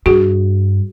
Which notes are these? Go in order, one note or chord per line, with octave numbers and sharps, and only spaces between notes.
G2 F#4 G#4